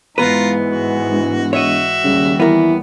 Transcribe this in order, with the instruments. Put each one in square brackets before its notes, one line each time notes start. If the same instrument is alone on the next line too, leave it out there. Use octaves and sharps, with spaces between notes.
[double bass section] G#2 E3 G#3 [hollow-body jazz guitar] B3 B4 [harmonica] F4 A#5
[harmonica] F#4
[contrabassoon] E1
[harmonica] F#4 E5 [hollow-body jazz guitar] C#5 D#5
[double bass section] D#2 G3 [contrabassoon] C#3
[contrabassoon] E3 [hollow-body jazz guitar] B3 A#4